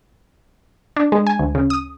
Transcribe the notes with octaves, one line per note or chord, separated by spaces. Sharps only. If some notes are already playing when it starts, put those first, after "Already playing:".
D4
G#3
G#5
D2
C#3
D#6